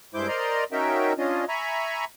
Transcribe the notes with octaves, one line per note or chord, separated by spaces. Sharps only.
G2 G#3 E4 C5 D6 G6
A#4 C5 D5 D#5 A#5 C6
C#4 D#4 F#4 A#4 E5 G5
C#4 D4 F4 D#5
E5 G#5 A#5 B5 C#6